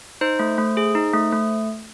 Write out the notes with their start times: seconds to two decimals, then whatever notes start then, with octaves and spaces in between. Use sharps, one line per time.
0.21 D#4 C5
0.39 A3
0.58 A3
0.77 G#4
0.95 D#4
1.13 A3
1.33 A3